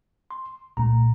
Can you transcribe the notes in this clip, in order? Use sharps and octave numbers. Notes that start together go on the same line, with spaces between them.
C6
C2 A#2 A3 A#5